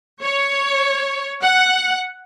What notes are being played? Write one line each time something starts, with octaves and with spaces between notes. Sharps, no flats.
C#5
F#5